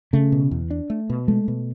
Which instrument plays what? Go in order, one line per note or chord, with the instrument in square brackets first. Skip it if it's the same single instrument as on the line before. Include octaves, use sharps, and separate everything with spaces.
[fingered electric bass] C#3 [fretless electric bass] A3
[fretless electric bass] B2
E2
D4
A3
B2
[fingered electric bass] G#3 [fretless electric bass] A3
[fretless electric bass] B2